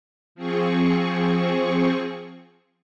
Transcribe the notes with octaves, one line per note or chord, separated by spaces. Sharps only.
F3 C4 G#4 C#6